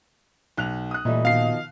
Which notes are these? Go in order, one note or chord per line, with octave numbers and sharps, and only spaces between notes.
B1 F#6 F7
D#6 F#6
A#2 E3 G3 A3 D#5
B2 D#3 F3 F5 C7